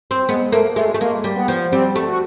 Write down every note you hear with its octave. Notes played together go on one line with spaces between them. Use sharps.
C4
G#3 B3
A3 A#3
G#3 A3
A3
G#3 A#3
G3
B3
F3
G3 C4
A3
F#4